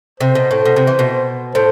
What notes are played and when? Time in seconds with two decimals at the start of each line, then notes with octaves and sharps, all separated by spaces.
0.20 C3 C5
0.35 B2
0.51 A2
0.65 B2
0.76 C3
0.87 E3
0.99 B2
1.55 A2 C5